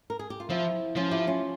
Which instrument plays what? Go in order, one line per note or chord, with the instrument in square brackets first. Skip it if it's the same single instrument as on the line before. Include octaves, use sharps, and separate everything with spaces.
[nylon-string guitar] A#4
G#4
G4
F4
[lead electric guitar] F3 [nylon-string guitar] C4 E4
[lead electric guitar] F3 [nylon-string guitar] C#4 F4
[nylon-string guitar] E4 G4
C#4 F4